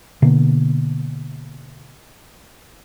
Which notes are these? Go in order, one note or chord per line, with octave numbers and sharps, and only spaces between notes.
B2 D3 A#3